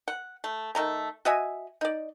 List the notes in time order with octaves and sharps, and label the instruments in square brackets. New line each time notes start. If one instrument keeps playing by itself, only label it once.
[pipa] F#5
A3
D#3 A3 A#5
F#4 D#5 E5 G#5
D#4 D5